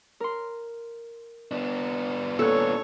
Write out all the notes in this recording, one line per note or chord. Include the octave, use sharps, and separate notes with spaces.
A#4 C6
B3 D4
A#2 C#4 A4 C#5 F#6